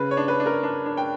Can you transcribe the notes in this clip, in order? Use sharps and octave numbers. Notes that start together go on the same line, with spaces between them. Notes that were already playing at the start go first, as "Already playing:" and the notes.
Already playing: C#3 B4
C#5
D4
B4
D4
A#4
D4
D4
G5